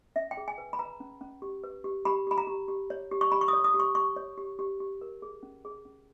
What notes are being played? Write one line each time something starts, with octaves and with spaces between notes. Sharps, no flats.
C#4 E5
G5
G#4
G#5
B4
B5
B4 A#5
C#4
C#4
G4
B4
G4
G4 B5
G4 B5
A#5
G4
G4
C#5
G4
C#6
G4 B5
C#6
D#6
C#5
D#6
G4
C#6
G4 C#6
C#5
G4
G4
G4
A#4
G#4
C#4
G#4
C#4